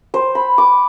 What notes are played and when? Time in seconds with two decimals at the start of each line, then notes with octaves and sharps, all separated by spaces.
0.14 C5
0.35 B5
0.58 D6